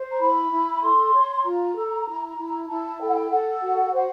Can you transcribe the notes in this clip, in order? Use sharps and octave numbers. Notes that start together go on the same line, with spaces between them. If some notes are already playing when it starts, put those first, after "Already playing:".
Already playing: C5
A#5
E4 B5
E4
A4 C6
C#5
F4 A#5
A4
E4
E4
E4 A5
A4 G5
F#5
G5
A4 F#5
F#4
C5 F#5